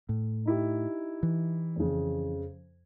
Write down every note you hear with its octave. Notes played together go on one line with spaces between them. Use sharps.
A2
D#4 E4 G4
E3
F2 C#3